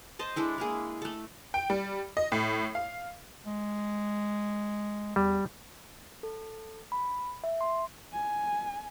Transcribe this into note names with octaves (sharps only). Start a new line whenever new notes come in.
C5 D#5 A5
G#3 D4 E4 A4
G#3 A#3 G#4
A3 A4
G5
G3
D#5
A2
F5
G#3
E2 G3
A4
B5
E5
C6
G#5